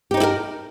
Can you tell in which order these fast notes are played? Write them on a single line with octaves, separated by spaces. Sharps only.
G4 D#4 C#5 E4 A#4